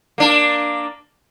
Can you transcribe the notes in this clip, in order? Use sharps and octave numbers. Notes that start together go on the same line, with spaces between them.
A#3 D4